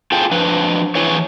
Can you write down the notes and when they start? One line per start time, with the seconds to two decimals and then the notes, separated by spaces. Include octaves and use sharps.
0.12 F4 G#4 A4 G5
0.31 F3 D4 B4
0.95 E3 E4 G#4 B4 C#5